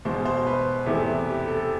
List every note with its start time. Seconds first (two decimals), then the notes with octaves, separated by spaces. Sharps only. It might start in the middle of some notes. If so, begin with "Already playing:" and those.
0.05 E2 B2 G#3 B3 C5
0.25 C5
0.46 B4
0.86 E2 C3 E3 A3
1.27 G4
1.48 A4